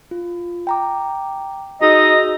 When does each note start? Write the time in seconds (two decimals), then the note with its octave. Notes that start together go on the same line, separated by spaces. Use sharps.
0.11 F4
0.67 G5 A#5 D6
1.81 D#4 F#4 G#4 D#5 E6